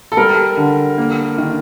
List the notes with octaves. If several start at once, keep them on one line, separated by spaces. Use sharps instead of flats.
A4
G3 A#4
D3
A#3
D#3